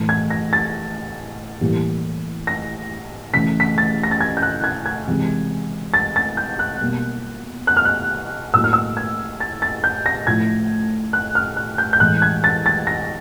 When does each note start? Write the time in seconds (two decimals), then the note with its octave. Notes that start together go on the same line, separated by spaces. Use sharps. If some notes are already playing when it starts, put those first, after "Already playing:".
Already playing: A2 E3 A3
0.09 G#6
0.30 A#6
0.53 A6
1.61 A2 E3 G3 A#3
2.47 A#6
3.34 C#3 E3 A3 B6
3.60 B6
3.78 A6
4.03 A#6
4.11 A6
4.21 G#6
4.37 G6
4.42 F#6
4.64 G#6
4.86 G#6
5.07 C3 E3 G#3
5.94 A6
6.16 A6
6.37 G6
6.59 F#6
6.80 B2 G3 A#3
7.67 F#6
7.77 F6
7.85 F#6
8.54 A2 F#3 A#3 E6
8.64 F6
8.73 E6
8.97 G#6
9.40 A6
9.62 A6
9.84 G6
10.06 A#6
10.27 A2 F3 A3 G#6
11.13 F#6
11.35 F6
11.57 F#6
11.78 G6
11.93 G6
12.00 A2 E3 G#3 F#6
12.22 G#6
12.44 A6
12.66 A6
12.87 A#6